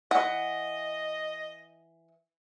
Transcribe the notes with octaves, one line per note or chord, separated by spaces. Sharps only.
E3 D#5 F#5